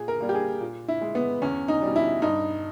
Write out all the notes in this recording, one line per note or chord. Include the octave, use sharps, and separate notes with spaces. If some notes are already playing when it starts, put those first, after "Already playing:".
Already playing: A#2 G#4
A#4
G3 A#3
G4
G#4
A#2
E4
G#3
B3
E2 C#4
D#4
B2 G3
E4
G2 D#4